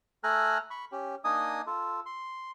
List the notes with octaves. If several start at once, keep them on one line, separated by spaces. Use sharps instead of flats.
A3 A4 G#5 A#5 F6 F#6
B5 C#6
C#4 G4
A#3 D4 D#4 D#5 G#5 D#6
F4 A4
C6